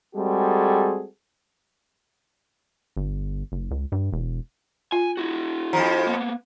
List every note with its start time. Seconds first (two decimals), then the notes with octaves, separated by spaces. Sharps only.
0.15 G3 G#3 C4 F#4 G#4 A4
2.97 G1
3.52 F#1
3.71 C#2
3.92 G2
4.12 E1
4.92 F4 G#5
5.17 E4 F#4
5.73 F2 A2 F3 A#5
6.07 A#3 B3